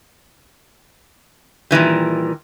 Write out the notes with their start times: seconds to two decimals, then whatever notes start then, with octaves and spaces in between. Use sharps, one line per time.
1.71 A#2 D#3 E3 G3